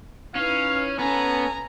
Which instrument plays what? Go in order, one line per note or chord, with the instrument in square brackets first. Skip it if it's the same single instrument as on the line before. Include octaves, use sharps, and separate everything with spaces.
[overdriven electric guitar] C#4 [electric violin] D#4 E4 [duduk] B4 [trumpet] F5
[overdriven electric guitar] B3 [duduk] C#4 [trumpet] A4 [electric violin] G#5 A#5